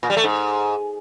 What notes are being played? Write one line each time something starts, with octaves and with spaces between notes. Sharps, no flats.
A#2
G3
A3
G#2